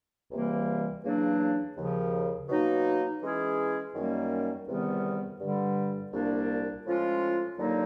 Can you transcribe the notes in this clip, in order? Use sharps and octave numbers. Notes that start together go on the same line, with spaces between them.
C#2 C3 E3 G3 A#3
E2 C#3 F#3 A#3 D4
D#2 C#3 F3
B2 F#3 A#3 D#4
E3 G#3 C#4 E4 G#4
F#2 D#3 G3 A#3 C#4
E2 C3 D#3 G3 B3
G2 D3 G3
C2 A#2 G3 A#3 D4
A2 F3 G#3 C#4 F4
D#2 D3 F#3 A#3 D#4